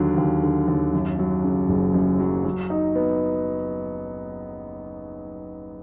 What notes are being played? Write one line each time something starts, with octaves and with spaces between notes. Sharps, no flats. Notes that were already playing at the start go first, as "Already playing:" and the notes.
Already playing: D#2 D3 F#3
D#2
D3
D#2
F#2
F#3
C#3
F#1
F#2
F#3
F#3
D#4
B3